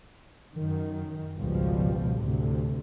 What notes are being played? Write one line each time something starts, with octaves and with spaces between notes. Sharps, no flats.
F#2 D#3
G#1 C#2 B2 F3 G3
D2 A2 C3